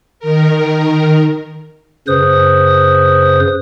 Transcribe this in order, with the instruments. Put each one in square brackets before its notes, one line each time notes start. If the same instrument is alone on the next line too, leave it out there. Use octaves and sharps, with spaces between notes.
[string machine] D#3 A#4
[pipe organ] F#2 C#3 B4 C5 D#6